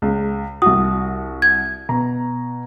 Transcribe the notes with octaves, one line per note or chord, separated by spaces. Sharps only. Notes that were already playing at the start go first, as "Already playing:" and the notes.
C#2
C2 F#4 D#6
G#6
B2 A#5